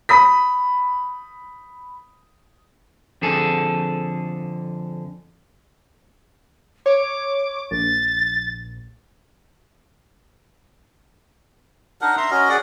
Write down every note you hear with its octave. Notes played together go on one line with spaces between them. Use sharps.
B5 D#6 B6
F2 D3 G#4 A4
C#5 D6
A#1 A6
D4 D#4 A#4 F#5
E5 A#5 C6
C#4 F#4 A#4 D#5
G#4 D5 F#5